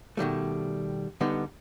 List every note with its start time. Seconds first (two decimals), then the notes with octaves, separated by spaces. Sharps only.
0.17 B2 D#3 G3 A3
1.21 D3 G3 B3 D#4